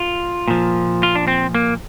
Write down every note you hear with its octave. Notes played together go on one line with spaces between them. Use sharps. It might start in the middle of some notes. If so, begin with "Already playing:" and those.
Already playing: F4
A#2 F3
F4
D4
C4
A#3